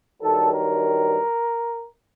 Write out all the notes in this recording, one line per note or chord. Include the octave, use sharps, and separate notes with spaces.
G2 D#3 F#3 A4
A#4